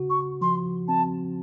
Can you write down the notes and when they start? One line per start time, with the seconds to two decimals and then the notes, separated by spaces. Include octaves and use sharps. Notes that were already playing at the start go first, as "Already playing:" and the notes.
Already playing: C#3 F#4
0.10 C#6
0.41 F3 C6
0.88 C4 A5